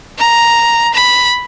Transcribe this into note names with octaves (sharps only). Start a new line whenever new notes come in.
A#5
B5